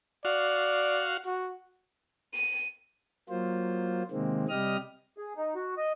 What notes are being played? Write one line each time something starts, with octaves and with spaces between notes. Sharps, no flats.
F#4 D5 F5
F#4
D#7
F#3 A#3 F4 C5
C3 D#3 G#3 A#3 C4
C3 G3 G4 D#5 D#6 F6
G#4
D#4
F#4
D#5